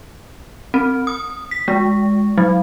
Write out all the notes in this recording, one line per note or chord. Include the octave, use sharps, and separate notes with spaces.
C4
D#6
B6
G#3
F#3